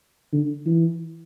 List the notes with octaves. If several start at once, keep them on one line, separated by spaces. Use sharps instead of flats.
D3
E3